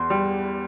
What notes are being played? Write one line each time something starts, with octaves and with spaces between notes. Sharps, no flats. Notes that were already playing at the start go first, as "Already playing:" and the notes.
Already playing: E2 C6
G3